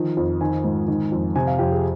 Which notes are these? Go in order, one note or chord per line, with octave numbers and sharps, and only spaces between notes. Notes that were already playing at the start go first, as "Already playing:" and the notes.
Already playing: D#3 F3
F2
D#3 G#5
G#2
D#3
F2
C3 G#5
F5
F2 G4
G#4